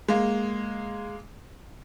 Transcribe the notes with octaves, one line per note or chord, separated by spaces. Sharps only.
G#3 A#3